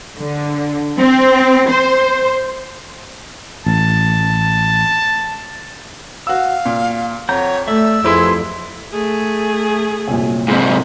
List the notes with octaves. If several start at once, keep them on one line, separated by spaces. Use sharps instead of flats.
D3
C4
C5
A1 A5
F#4 F5 E6
A#2
F2 C#5 F#5 A#5 G6
A3 D5 E5 E6
F2 C4 E4 G4 G#4 B4 C6
A3 G#4
C2 F#2 A#2
G#2 C3